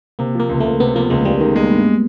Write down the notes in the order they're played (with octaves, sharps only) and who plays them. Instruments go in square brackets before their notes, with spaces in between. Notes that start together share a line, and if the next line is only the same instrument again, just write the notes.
[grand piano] C3 [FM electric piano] A#3
[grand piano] F3 [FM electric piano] A#3
[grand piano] C#2
[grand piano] C#2 [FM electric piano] A3
[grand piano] C3 [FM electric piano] B3
[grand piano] F3 [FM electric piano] A#3
[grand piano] C#2 [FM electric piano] G#3
[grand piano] C#2 [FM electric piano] G3
[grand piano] D#3
G#3
G2